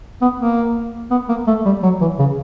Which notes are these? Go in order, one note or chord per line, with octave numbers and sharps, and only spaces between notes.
B3
A#3
B3
A#3
A3
G3
F#3
E3
C#3